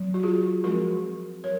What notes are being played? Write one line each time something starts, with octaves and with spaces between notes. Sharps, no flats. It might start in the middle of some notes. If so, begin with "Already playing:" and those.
Already playing: F#3 C4
F#4
F4 G#4
F3 G#3 C4 F#4 A#4
F#3 A#4 C#5